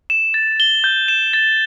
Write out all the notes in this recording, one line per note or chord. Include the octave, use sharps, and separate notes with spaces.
E7
A6
G7
G6
E7
A6